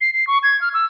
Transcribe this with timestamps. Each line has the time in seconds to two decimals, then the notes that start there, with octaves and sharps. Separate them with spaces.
0.01 C7
0.14 C7
0.27 C#6
0.43 G#6
0.61 F6
0.74 E6